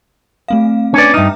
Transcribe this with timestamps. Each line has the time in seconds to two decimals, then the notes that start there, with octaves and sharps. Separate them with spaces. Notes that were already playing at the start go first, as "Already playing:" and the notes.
0.48 A3 C4 F5
0.94 C#4 D4 B4 D5
1.14 G2 D#4 E5 A#5 F6